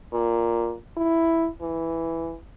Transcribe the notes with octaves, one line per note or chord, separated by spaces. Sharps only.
A#2
E4
E3